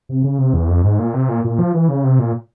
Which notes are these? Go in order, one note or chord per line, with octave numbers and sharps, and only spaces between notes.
C3
C#3
C3
E2
F2
G#2
A#2
C3
A#2
A#2
F3
E3
C#3
C3
A#2